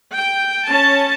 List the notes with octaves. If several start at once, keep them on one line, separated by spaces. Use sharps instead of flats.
G5
C#4 A5